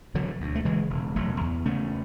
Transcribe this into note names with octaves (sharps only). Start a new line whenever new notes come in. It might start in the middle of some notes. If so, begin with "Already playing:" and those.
E1 D3 F#3
D2
A3
C#3 E3 G#3
E1
E1 F#3 A3
E2
C#3 A3 C#4